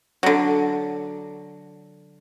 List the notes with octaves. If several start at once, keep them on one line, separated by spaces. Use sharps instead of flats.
D3 F#3